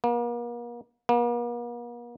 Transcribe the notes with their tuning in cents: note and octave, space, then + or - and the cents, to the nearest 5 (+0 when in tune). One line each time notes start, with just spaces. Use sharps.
A#3 +40
A#3 +45